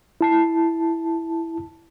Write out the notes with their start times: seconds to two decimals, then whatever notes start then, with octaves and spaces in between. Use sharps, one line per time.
0.21 E4 A5 C7